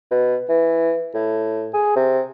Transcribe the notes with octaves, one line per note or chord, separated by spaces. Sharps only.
B2
E3
A2
G#4
C3